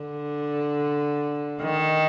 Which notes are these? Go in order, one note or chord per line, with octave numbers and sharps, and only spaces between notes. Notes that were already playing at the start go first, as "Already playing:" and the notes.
Already playing: D3
D#3